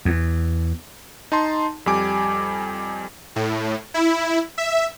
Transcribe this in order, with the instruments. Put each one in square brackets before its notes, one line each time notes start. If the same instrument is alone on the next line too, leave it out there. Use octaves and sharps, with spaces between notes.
[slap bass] E2
[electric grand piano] D#4 A5 C6
F2 G3 G4 G#5 D6
[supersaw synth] A2
E4
E5